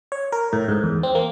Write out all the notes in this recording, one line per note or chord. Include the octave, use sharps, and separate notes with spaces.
C#5
A#4
A2
G#2
E2
C4
A#3